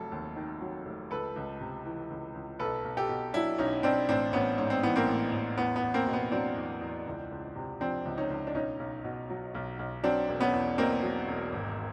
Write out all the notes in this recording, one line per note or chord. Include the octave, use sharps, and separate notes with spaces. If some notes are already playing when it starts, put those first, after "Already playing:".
Already playing: F1 F#3 A4
D#2
D#3
F#3
F1
C#2 A4 B4
C#2
C3
E3
C#2
C#2
B1 A4 B4
B1
G4 A4
B2
F#3 D4 E4
B1 C#4 D#4
B1 C4 D4
A1 C4 D4
A1 B3 C#4
G#2 C#4
C4
E3 B3
A#3 C4
A1
A1
E2 B3
B3
E2
A#3 C4
B2
B3
F#3 C4 D4
E2
E2
C#2
C#2
C3
F3 C4 D4
C#2
C#4 D#4
C#2
D4
B1 C#4 D#4
B1
B2
F#3
B1
B1
F#3 C4 D4
E1
B3 C#4
E2
B2 A#3 C4
F#3
E1
G#1